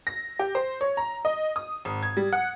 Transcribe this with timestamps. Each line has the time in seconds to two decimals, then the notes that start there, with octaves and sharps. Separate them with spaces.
0.07 A#6
0.39 G4
0.55 C5
0.81 C#5
0.97 A#5
1.25 D#5
1.56 D#6
1.85 G#1
2.03 G#6
2.17 G3
2.33 F#5